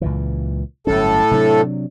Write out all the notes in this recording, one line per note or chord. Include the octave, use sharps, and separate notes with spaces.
C#2 A#2 E3
G1 A2 F#3 C#4 A4
C3 F#3 D4